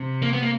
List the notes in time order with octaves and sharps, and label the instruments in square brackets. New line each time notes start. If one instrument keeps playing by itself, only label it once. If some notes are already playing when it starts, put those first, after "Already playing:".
Already playing: [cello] C3
[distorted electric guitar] A#3
B3
A#3